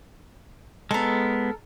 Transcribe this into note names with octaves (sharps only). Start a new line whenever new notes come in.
G#3 B3 A4 A#4